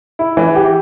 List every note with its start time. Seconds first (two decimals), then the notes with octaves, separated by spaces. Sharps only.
0.19 E4
0.37 E3
0.55 G4